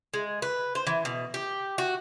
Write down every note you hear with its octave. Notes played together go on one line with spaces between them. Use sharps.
G#3
B4
C5
E3
B2
G4
F#4